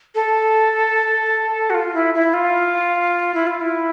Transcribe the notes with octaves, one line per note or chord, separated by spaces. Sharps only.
A4
F#4
F4
E4
E4
F4
E4
F4
E4